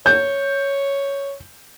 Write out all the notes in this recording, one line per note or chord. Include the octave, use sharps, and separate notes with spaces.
C#5 G6